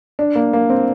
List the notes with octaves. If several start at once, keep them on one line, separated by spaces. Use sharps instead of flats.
D4
A#3
A#3
C4